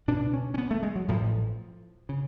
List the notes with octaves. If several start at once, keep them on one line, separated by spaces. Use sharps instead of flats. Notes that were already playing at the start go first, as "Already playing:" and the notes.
C#2 B2 D4
C#4
C#4
B3
A3
G#3
F#3
A1 A2 F3
C#3